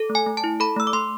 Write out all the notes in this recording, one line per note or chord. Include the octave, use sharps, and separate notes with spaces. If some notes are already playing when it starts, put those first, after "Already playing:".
Already playing: A4
A3
G#5
A3
A5
E4
A4 B5
A3 E6
D6
A3 C6